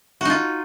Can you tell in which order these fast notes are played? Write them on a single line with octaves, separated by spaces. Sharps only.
F#4 D#4 F4